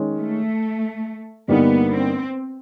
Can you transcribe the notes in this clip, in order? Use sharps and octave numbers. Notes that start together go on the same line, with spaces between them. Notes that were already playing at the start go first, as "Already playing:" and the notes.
Already playing: D#3 G#3 C#4
A3
G2 D3 G3 A#3 B3 D#4
C4